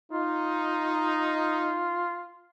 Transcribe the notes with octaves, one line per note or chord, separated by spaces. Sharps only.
D#4 F4